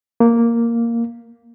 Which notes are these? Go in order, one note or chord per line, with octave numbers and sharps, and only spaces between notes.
A#3